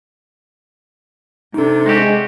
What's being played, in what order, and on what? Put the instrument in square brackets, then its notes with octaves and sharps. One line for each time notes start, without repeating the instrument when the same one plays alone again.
[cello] C3 D4 [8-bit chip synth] D#4 A4
[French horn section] G#3 [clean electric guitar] C4 F#4 G4